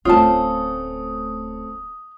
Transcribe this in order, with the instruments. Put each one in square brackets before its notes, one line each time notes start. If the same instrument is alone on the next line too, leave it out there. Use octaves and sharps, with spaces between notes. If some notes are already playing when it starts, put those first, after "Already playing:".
[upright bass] D1 [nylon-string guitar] A3 C4 C#4 [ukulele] F4 A5 [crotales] D#6